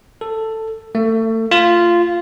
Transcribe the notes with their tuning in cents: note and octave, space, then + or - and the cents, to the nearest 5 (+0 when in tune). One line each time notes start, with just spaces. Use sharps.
A4 +10
A3 +30
F4 -10